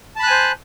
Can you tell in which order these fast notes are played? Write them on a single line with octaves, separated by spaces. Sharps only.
A5 B5 F#6 G#5 C5